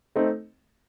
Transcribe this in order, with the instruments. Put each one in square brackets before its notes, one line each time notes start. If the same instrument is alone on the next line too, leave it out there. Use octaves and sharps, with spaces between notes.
[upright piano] A3 C4 D#4